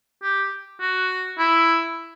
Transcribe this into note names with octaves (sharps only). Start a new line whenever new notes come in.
G4
F#4
E4